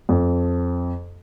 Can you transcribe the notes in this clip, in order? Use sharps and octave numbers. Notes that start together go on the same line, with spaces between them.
F2